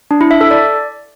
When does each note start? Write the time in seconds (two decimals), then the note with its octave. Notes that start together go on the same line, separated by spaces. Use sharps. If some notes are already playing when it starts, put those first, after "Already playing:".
0.11 D4
0.21 E4
0.31 E5
0.41 A4
0.51 D5